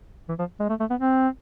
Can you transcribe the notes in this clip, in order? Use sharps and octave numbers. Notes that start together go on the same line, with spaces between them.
E3
F3
G#3
A3
A3
B3
C4